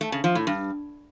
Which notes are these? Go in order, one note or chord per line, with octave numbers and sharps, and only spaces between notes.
A3
C#3
F3
A2
G2